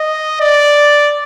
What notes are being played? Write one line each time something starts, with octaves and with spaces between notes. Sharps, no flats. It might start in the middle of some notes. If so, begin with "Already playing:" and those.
Already playing: D#5
D5